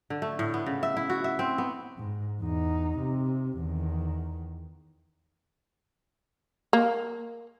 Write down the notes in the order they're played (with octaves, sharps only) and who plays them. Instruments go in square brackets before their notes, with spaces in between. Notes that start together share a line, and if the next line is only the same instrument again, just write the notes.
[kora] D3
A3
A2
B3
C#3
E5
E4
F#4
E5
C4
B3
[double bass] G#2
E2 D#4
C3
E2 D#3
[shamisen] A#3